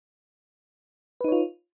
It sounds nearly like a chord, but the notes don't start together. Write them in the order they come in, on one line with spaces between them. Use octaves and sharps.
B4 D#4 C#5 F4